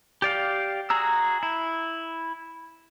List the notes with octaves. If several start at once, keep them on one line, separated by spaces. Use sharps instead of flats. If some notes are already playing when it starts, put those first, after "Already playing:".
G4 D5 F5
F#4 G#4 A#5 E6
E4